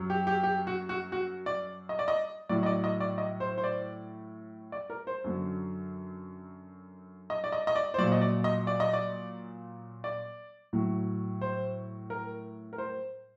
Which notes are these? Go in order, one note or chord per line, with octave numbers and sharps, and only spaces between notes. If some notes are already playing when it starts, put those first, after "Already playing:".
Already playing: F#2 F#3
G4
G4
G4
F#4
F#4
F#4
D5
D#5
D5
D#5
A2 F#3 D5
D#5
D5
D#5
D5
D#5
C5
C5
D5
D5
A#4
C5
F#2 D3 F#3
D#5
D5
D#5
D#5
D5
C5
A#2 F#3 D5
D#5
D5
D#5
D5
D#5
D5
D5
A2 F#3
C5
A#4
A#4
C5